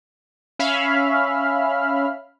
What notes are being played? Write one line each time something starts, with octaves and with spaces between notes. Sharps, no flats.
C#4 E5 F5 B5 F6